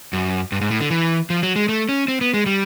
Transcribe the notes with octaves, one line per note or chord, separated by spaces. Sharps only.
F#2
G2
G#2
A2
D3
E3
F3
F#3
G#3
A3
C#4
C4
B3
G#3
G3